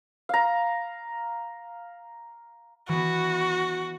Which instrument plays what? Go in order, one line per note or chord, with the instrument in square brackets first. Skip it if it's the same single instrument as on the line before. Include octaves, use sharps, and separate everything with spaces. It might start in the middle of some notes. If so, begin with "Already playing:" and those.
[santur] F5 A#5
[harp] E3 B3 [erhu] F#4